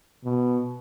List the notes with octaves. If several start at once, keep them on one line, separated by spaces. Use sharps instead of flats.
B2